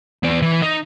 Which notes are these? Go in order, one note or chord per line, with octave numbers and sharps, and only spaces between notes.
E2 D5
E3
D#4